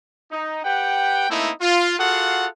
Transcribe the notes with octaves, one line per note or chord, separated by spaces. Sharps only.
D#4
G4 B4 F#5 G5
A3 A#3 C4 D#4 E4
F4
F4 F#4 G#4 A4 F5 F#5